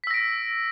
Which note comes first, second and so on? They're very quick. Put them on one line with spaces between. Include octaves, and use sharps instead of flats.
B6 E6 A#6 D7